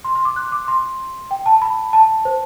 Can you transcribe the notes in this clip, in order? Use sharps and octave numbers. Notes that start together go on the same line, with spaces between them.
C6
C6
D6
F#6
D6
C6
G5
A5
B5
A5
C5